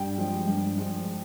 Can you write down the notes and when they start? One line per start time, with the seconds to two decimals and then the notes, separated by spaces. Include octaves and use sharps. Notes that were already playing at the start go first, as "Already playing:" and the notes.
Already playing: G2 G5
0.18 F3 G#3
0.47 G2
0.78 F3 G#3